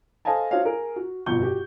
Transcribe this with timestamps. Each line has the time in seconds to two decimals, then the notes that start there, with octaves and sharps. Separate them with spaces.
0.25 A4 C5 D#5 F5 G#5 A5
0.51 D4 F#4 C5 C#5 D#5 F5
0.65 G#4 A#4
0.96 F#4
1.26 G1 F2 B2 C#6 G6 G7
1.42 F#4 G4